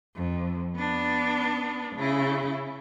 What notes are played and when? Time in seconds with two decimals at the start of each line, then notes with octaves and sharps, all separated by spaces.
0.15 F2
0.76 B3 D4
1.96 C#3 E4